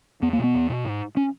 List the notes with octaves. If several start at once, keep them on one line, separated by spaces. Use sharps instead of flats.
E2 B3
A#3
B2 B3
E2
B2
G#2
C#4